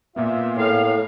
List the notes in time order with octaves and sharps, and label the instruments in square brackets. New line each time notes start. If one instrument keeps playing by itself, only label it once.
[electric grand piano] A#2 A#3 B3 [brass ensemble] F4 E5
[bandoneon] A2 [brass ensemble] G#4 A#4 C#5 [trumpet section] F5